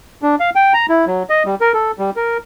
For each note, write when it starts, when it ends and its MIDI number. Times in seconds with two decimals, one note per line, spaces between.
0.22 0.35 62
0.40 0.50 77
0.55 0.73 79
0.74 0.86 82
0.89 1.05 64
1.07 1.23 54
1.30 1.43 75
1.46 1.55 55
1.61 1.72 70
1.74 1.91 69
1.99 2.10 55
2.16 2.37 70